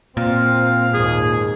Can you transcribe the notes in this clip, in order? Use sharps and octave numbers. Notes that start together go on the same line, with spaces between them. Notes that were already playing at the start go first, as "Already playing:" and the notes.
A#2 C4 F5
D#2 G#2 G#4